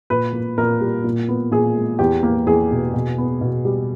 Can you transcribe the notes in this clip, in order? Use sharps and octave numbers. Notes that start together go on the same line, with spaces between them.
A#2 B4
A#3
A#2 A#4
G3
A#2
B3
A#2 G#4
G#3
E2 G4
A#3
E2 G#4
B2
B2
B3
B2
G3